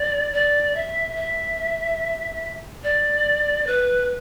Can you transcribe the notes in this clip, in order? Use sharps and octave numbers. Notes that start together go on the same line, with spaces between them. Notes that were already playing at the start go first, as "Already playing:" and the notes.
Already playing: D5
D5
E5
E5
D5
B4